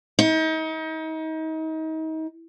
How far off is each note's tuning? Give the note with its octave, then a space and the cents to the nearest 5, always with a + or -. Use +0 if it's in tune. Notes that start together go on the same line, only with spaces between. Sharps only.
D#4 +35